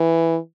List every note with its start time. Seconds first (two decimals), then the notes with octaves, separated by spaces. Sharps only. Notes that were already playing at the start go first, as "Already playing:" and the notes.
Already playing: E3